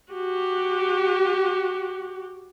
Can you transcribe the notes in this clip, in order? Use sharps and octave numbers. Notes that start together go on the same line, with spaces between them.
F#4 G4